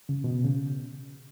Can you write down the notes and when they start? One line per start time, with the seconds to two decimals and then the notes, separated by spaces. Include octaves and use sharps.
0.09 C#3
0.24 B2
0.44 C#3